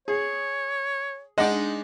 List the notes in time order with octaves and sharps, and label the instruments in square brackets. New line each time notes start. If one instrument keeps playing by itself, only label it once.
[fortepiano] G#4 [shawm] C#5
[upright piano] G#3 [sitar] D4 D#4 D5 [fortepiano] D#5 F#5